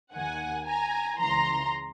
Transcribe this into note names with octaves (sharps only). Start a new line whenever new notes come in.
D#2 D#3 F#5 G#5
G#5 A#5
C#2 C#3 E3 A#5 C6